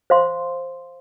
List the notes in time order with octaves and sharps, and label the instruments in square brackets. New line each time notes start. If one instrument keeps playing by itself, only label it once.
[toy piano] C5 F5 C6